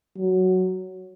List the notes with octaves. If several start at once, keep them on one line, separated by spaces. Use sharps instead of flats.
F#3